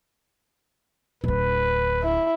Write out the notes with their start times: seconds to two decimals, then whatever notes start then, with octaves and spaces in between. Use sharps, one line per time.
1.24 D1 D3 B4
2.03 E4